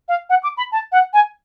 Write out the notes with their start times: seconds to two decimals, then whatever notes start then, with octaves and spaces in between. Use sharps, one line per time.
0.08 F5
0.30 F#5
0.43 D6
0.57 B5
0.72 A5
0.92 F#5
1.13 G#5